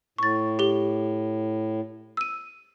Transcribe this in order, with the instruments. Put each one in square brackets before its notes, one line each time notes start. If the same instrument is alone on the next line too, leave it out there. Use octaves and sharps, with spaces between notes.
[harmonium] A2 [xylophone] C#6 A6
[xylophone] G4 G7
E6 D#7